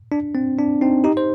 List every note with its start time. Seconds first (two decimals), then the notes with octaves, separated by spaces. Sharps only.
0.12 D4
0.35 C4
0.59 D4
0.81 C4 D#4
1.04 D#4 G4
1.17 C5